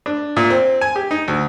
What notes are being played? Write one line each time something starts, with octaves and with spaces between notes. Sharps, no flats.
D4
A#2
C4
G#5
G4
D#4
D2